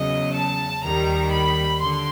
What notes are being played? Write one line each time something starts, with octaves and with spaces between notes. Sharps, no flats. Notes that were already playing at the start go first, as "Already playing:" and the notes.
Already playing: E2 C#3 F#3 D#5
A5
D#2 D#3 G3 A#5
B5
D3 C6